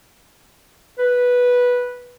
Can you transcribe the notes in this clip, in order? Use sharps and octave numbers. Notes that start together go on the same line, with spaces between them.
B4